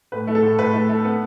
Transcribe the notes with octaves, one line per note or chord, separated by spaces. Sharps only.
A2 B4
A3
A4
A2
A2 B4
A3
A3
B3